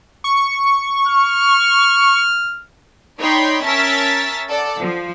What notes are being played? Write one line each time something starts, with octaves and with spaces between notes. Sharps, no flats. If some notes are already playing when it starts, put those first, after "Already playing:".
C#6
F6
D#4 C#5 D5 G5 B5 C6
C#4 A#4 E5 A5 A6 B6
A4 D5 F#5
F3